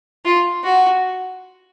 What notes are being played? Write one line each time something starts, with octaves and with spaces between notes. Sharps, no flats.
F4
F#4